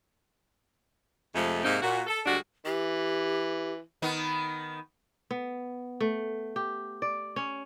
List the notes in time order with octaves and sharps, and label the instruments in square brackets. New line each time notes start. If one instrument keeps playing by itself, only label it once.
[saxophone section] F2 C3 F3 G#3 A3
G#2 C3 A#3 C4 D#4
A#2 F#4
A4
D2 G3 G#3 D4 F#4
[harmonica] E3 [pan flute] G4
[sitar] D#3 B3
[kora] B3
A3
G4
D5
C#4